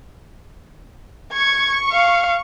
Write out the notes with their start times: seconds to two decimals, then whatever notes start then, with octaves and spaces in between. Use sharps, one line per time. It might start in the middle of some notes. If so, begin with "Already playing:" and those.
1.34 C#6 G#6
1.93 F5